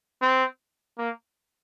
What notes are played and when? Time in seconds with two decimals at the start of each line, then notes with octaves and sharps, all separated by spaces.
0.22 C4
0.98 A#3